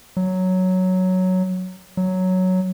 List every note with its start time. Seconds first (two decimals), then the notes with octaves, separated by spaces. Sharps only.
0.17 F#3
1.97 F#3